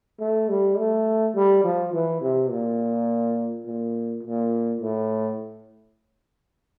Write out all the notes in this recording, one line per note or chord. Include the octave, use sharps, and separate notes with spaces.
A3
G3
A3
G3
F3
E3
C3
A#2
A#2
A#2
A2